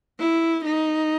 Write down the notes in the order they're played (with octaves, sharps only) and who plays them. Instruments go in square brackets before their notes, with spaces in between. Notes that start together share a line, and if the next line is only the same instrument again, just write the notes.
[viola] E4
D#4